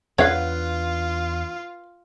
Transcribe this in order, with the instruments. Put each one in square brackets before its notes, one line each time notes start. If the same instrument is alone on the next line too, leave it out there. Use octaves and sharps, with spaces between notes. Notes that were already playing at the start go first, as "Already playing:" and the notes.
[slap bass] E2 D4 [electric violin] F4 [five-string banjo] B4 F5 [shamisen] C#5 F#5